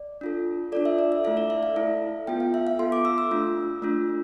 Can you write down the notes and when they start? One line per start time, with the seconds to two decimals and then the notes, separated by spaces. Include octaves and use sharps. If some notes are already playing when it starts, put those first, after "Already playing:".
Already playing: D5
0.21 D4 F4 A4
0.72 D4 F4 A4 D5
0.85 E5
0.99 D5
1.12 E5
1.24 A3 E4 A4 E5
1.37 D5
1.50 E5
1.63 F5
1.76 A3 E4 A4
2.27 B3 F4 A4 G5
2.40 F5
2.54 E5
2.67 F5
2.79 B3 F4 A4 C6
2.92 D6
3.05 E6
3.18 E6
3.31 A3 D4 F4
3.82 A3 D4 F4